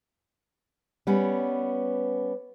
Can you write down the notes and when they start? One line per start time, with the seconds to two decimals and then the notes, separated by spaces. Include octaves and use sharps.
1.07 G3 B3 C#4